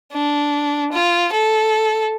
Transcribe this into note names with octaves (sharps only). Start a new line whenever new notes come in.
D4
F4
A4